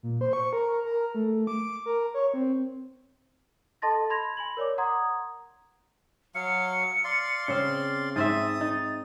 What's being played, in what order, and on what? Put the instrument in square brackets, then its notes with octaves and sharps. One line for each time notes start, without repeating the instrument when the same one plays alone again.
[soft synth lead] A#2
C5
C#6
A#4
A#4
A3
D6
A#4
C#5
C4
[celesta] A4 D#5 A5 C6 A6 A#6
B5 C6 G#6 A#6 F7
G#5 B5 F#7
A#4 C#5 D5 D6
F#5 A#5 C6 D#6 G#6
[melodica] F#3 F5 [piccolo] C#7
[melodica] D5 F5 C6
[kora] C#3 C4
[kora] G#2 C4 E5 [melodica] D#6 [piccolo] A6
[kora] D#4